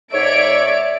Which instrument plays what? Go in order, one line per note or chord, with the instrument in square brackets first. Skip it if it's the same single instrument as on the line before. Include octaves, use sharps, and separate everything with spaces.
[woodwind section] G#2 C#5 [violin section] D5 E5 D7